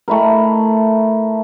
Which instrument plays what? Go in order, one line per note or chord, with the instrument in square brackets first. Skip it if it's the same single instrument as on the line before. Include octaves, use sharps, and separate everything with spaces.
[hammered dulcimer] A3 E4 A#4